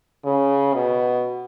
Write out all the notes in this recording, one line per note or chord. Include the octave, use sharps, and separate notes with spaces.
C#3
B2